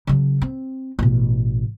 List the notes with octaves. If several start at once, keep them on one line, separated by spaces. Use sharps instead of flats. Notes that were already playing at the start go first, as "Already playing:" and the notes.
C#3 F#3
C4
A1 B2